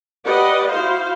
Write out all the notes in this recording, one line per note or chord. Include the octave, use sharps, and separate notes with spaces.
G4 B4 D5 D#5 F#5
E4 F#4 C5 F5